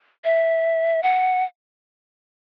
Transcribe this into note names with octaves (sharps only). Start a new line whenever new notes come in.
E5
F#5